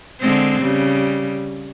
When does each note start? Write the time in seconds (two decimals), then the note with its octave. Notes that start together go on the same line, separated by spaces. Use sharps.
0.20 D3 G#3 C4
0.62 C#3 G3